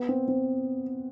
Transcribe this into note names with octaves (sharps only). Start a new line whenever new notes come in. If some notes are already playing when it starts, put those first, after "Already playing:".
Already playing: B3
C4
C4